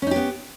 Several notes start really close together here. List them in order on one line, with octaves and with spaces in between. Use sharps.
C#4 D#4 G4 B3